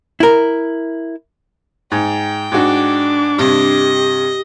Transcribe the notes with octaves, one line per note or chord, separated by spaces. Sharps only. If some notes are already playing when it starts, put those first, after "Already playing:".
E4 A#4
G#2 G5
G#2 D4 F#4 D6
G2 C3 G4 D#5